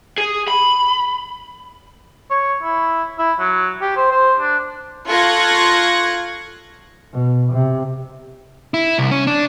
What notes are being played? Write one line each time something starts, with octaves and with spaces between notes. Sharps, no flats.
G#4
B5
C#5
E4
E4
F#3
G4
C5
C5
D4
F4 A4 C#6 F#6 G#6 A#6
B2
C3
E4
C2
C#4
D4